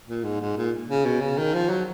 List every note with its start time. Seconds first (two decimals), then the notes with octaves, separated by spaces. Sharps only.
0.08 A#2
0.24 G#2
0.40 G#2
0.56 A#2
0.89 C#3
1.05 B2
1.21 C#3
1.38 D#3
1.54 F3
1.70 F#3